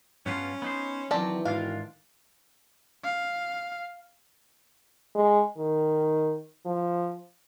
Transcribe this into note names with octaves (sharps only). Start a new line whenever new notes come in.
G2 B3 C#4 F4
B3 D#4 C5
D#3 E3 F#3 C4 G4 D5 A5
G#2 B2 D4 F4 F5
F5
G#3
D#3
F3